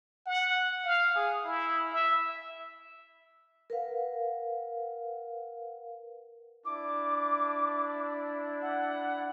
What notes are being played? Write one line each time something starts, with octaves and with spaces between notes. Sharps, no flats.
F#5
F5
G#4
E4
E5
A#4 B4 F5 F#5
D4 E4 D6
F#5